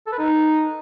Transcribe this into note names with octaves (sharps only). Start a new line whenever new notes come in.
A4
B4
D#4